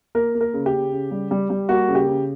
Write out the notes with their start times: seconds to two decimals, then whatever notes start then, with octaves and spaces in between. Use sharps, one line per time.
0.15 A#3 A#4
0.35 A#3
0.41 A#4
0.54 C#3
0.66 G4
0.73 C#3
0.92 C#3
1.11 G3
1.31 G3
1.50 G3
1.69 A#3 F#4
1.88 C#3
1.95 G4
2.07 C#3